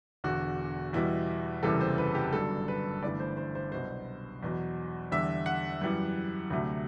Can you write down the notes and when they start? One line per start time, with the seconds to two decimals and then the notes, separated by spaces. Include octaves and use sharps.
0.24 E1 E2 D3 F#4
0.93 E2 B2 G3 E4
1.63 F#1 E2 C3 E3 G3 A4
1.80 C5
1.98 B4
2.15 G4
2.33 G1 G2 F#3 A4
2.68 B4
3.03 G1 G2 E3 A3 D5
3.20 C5
3.37 C5
3.55 C5
3.72 C2 B2 F#3 C5
4.43 E2 B2 F#3
5.11 E2 D3 G3 E5
5.46 F#5
5.81 F#2 E3 G3
6.50 D2 C3 F#3 A3